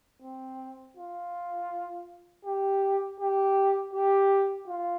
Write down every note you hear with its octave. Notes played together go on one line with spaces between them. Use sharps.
C4
F4
G4
G4
G4
F4